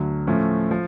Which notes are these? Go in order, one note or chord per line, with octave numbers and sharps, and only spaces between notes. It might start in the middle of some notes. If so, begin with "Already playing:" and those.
Already playing: D2 D3 F#3
A2 F3 A3 C#4
F3